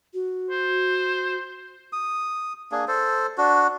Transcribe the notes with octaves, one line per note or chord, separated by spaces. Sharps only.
F#4
C5
D#6
A#3 D4 G#4
A4 C5
D4 F#4